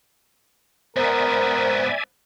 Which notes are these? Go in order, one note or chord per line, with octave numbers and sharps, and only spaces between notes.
G#2 B3 A#4 C5 D5 E5 G#5